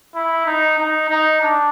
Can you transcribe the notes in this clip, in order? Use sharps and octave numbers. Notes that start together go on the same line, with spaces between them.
E4
D#4
D#4
D#4
D4